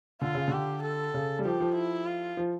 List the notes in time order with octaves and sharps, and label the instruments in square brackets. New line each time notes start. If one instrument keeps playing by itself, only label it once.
[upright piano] D3 [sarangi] F4
[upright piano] C#3
[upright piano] D3 [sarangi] G4
[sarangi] A4
[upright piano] C#3
G3
[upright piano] F3 [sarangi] G4
[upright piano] F3
[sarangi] E4
F4
[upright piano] F3